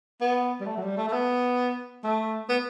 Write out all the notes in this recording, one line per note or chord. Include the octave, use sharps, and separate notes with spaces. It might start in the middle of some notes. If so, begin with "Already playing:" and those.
B3
G3
A3
F#3
G3
A3
A3
B3
A3
B3